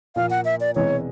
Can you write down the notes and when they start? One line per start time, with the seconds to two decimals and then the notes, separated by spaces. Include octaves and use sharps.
0.16 A#2 F3 A#3 F5
0.30 F#5
0.45 E5
0.60 D5
0.75 E1 E2 C3 E3 G#3 C#5